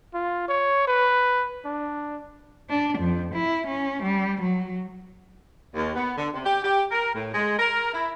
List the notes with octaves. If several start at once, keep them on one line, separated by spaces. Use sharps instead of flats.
F4
C#5
B4
D4
D4
F2
E4
C#4
G3
F#3
D#2
B3
D3
C3
G4
G4
A#4
A2
G#3
A#4
E4